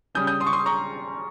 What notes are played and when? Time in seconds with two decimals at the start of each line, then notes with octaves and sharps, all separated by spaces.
0.15 C#3 G3 C#4 D#6 G6
0.27 D#6 G6
0.40 C6 D#6
0.47 C#6
0.53 C6 D#6
0.66 A#5 C#6